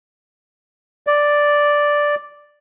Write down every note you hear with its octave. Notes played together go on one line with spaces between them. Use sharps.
D5